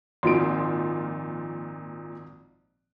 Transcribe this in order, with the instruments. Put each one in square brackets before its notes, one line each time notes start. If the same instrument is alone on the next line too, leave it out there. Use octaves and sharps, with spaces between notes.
[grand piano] G#1 D#4 D7 [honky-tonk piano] A#2 F3 C6